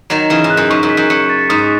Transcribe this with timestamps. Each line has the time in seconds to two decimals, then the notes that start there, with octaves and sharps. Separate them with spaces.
0.10 D#3 F#3 E7
0.30 C#3 E3 E7
0.44 G#2
0.50 F#6
0.57 F#2
0.70 G#2 C#6
0.83 F#2
0.90 B6
0.97 F#2
1.10 F#2 C#7
1.30 A6
1.49 G#2 D#6